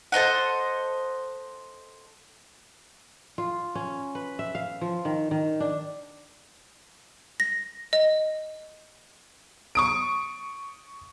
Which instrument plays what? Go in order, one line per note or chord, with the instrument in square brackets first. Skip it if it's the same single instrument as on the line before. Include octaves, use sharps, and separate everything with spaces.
[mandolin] A4 C5 D#5 F#5
[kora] F4
C#4
B4
E5
F5
F3
D#3
D#3
D4
[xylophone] A#6
D#5
[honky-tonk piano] C#6 D#6 D7